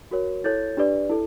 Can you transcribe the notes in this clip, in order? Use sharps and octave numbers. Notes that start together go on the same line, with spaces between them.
F#4 A#4 C#5
E4 A4 C#5 G6 A6
D4 G4 B4 D5
E4 A4